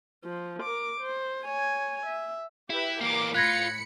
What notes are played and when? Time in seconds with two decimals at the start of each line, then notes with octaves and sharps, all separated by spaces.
0.24 F3
0.63 A#4 D6
1.01 C5
1.45 C#5 G#5
2.06 E5
2.70 E4 G4 B4 E5
3.01 E3 A#3 A#4 D6
3.35 A2 F4 B5 F#6 G#6 A#6 C#7